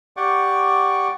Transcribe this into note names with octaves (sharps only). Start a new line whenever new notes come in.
G4 D5 F#5 G5 C#6 D6